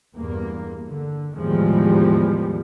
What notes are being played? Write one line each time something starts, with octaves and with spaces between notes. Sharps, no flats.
E2 G2 A#3
D3
E2 A2 D#3 F3 G3 G#3